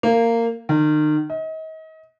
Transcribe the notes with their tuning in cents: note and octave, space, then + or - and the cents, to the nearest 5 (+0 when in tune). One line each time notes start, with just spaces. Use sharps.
A#3 -15
D#3 -35
D#5 +35